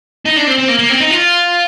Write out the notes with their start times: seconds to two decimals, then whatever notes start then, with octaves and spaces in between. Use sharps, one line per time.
0.25 D#4
0.36 D4
0.47 C4
0.58 C4
0.68 A#3
0.79 A#3
0.89 C4
1.00 D#4
1.10 F4